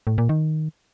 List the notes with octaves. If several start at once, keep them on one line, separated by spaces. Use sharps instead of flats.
A2
A#2
D#3